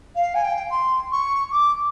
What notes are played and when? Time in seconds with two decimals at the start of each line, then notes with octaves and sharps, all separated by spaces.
0.15 F5
0.34 G#5
0.43 G5
0.70 C6
1.11 C#6
1.51 D6